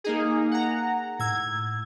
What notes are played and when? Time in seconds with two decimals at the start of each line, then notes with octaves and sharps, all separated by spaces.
0.04 A#3 D#4 G#4
0.51 F#5 A#5
1.19 A2 E6 G#6